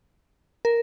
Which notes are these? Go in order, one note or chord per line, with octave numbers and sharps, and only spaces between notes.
A#4